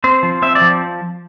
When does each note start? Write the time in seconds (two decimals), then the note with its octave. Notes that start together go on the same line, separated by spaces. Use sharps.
0.04 C4 C5
0.23 F3
0.42 C4 E5
0.55 D5
0.62 F3